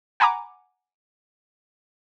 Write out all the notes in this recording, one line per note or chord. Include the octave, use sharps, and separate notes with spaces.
F#5 G#5 A#5 B5 D6